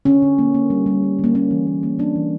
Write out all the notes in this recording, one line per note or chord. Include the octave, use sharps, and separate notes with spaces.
D3 C#4
D3
A#3
A#3
G3
G3
A#3
D3 A#3
A#3 C#4
E3
A#3
A#3
A#3 D4
E3